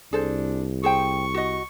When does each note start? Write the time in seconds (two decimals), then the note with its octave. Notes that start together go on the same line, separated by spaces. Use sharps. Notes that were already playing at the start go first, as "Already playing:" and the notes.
0.13 C2 D4 G#4 A4 C5
0.84 G#4 C5 G5 C#6
1.34 F#4 D#5